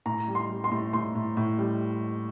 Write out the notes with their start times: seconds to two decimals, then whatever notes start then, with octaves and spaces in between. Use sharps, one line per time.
0.06 A2 A#5
0.28 G3
0.35 C6
0.50 G3
0.64 C6
0.71 A2
0.93 A2 C6
1.15 A2
1.37 A2
1.58 G3